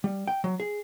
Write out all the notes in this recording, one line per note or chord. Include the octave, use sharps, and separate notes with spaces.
G3
G5
F#3
G#4